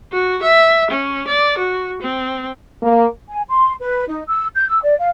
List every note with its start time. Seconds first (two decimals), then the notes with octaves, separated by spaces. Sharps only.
0.12 F#4
0.42 E5
0.90 C#4
1.27 D5
1.58 F#4
2.02 C4
2.83 A#3
3.29 G#5
3.48 C6
3.81 B4
4.08 D#4
4.28 E6
4.55 G6
4.68 E6
4.83 D5
4.99 F5